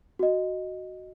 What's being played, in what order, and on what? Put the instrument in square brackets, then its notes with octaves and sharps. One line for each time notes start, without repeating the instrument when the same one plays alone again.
[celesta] F#4 D#5